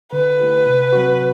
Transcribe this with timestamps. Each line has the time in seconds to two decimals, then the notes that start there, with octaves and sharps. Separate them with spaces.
0.12 D3 B4
0.39 A3 E4 G4
0.66 C3
0.92 F#3 C4 F#4